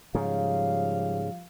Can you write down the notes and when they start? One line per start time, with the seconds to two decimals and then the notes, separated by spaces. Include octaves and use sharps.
0.15 G#2 C#3 F3 G3 F5